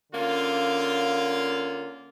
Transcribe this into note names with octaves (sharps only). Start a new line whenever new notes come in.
D3 A#3 C#4 F4